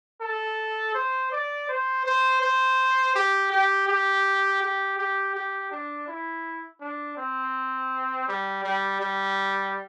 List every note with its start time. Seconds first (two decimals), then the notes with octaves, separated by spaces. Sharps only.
0.21 A4
0.95 C5
1.32 D5
1.69 C5
2.05 C5
2.42 C5
3.15 G4
3.51 G4
3.87 G4
4.62 G4
4.98 G4
5.35 G4
5.71 D4
6.08 E4
6.81 D4
7.17 C4
8.28 G3
8.64 G3
9.00 G3